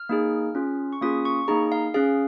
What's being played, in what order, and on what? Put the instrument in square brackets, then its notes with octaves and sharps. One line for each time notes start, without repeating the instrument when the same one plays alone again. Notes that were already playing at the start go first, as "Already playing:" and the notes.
Already playing: [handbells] F6
A#3 D#4 G#4
C#4 F4 G#4
C#6
A#3 C#4 F4 G#4 D#6
C#6
A#3 D#4 G#4 A#5
F5
C#4 G#4 F5